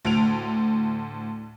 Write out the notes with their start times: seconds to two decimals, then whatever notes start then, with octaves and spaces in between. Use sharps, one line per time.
0.05 D2 A2 D7 F7